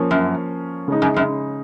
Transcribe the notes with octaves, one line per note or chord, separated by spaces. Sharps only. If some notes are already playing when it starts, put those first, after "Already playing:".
Already playing: F3 A#3 C#4
F#2
C#3 G#3 D#4
F#2
F#2